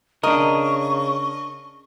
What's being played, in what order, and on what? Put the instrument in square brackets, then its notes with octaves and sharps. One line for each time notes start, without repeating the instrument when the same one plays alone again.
[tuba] C#3 [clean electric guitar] D4 A#4 [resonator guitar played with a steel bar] D#5 [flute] C#6